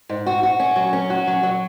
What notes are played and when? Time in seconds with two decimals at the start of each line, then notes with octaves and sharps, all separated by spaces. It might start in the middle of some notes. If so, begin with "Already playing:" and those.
0.09 G#2
0.27 F#4
0.43 F#4
0.60 C#4
0.76 F#3
0.93 C#4
1.10 F#4
1.27 F#3
1.43 F#3